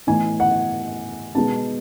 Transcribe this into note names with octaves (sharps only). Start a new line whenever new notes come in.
A2 E3 B3 D#4 G#5
F#5
B2 G#3 B3 D#4 A5